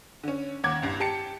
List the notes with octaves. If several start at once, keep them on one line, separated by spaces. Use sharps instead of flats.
D3 C#4
D#2 F#5 D6 G#6
C2 G2
G4 A5 C#7